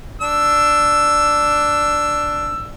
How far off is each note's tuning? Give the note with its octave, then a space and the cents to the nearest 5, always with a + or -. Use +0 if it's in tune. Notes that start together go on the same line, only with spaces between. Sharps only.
D4 +0 E6 +10